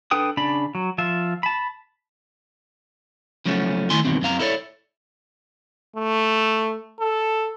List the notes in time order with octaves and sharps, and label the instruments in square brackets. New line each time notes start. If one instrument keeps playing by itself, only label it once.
[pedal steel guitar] D4 A4 B4 G5 D#6
C#3 D4 D5 B5
F#3
F3 F4 E5
A5 B5
[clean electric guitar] C#3 F3 F#3 A3 C#4
D#3 A3 E4 G#5 C6
E2 G2 B2 D#3 C4
F#2 C4 F5 A#5
E4 A4 A#4 C#5 D5
[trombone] A3
A4